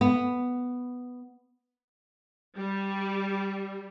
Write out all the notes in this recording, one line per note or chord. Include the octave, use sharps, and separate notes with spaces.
B3
G3